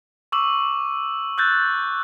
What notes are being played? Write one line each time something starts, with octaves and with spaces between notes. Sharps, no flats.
C#6 D6 E6 F#7
E6 F#6 G6 A6